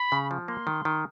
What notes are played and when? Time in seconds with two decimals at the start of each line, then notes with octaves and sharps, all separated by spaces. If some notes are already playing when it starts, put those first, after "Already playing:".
Already playing: B5
0.12 C#3
0.31 F3
0.48 A#3 C6
0.67 D#3
0.85 D#3